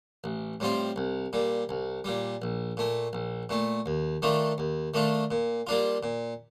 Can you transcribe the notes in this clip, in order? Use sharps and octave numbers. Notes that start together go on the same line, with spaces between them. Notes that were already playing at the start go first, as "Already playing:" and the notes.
A1
A2 G3 C4 F4
C2
A#2 G3
C2
A#2 G3
A#1
A#2 A3
A#1
A#2 A3
D#2
D#3 A3 D4 F4
D#2
D#3 A3 D4 F4
A#2
G3 A#3 D4 F4
A#2